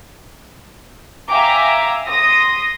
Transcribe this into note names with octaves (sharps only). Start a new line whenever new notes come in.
E5 F5 G5 G#5 A#5 D6
C6 D#6 A#6